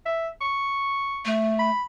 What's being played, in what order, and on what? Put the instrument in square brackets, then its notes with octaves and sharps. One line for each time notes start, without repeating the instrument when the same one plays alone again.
[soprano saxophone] E5
C#6
[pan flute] A3
[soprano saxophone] B5